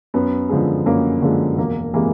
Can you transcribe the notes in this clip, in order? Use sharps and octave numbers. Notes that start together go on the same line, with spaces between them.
F#2 B3
D3 F3 G#3
F#2 A#3
D3 F3 G#3 A#3
E1 A#3
C3 E3 G#3 A#3